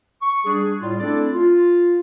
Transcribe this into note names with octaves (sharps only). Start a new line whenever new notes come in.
C#6
G3 D4 G#4
A2 G3 F4
A3 C4 D4 E4 A4 D5
F4